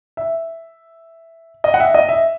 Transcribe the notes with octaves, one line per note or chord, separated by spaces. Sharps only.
E5
D#5
F#5
E5
D#5
E5